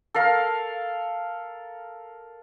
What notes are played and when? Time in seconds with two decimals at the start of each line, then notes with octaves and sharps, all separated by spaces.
0.14 A4 A#4 F5